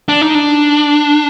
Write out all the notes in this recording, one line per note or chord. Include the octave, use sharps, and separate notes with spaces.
D4
D#4
D4